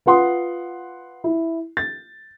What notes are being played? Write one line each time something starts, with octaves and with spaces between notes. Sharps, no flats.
F4 B4 F#5 C6 D#6
E4
A6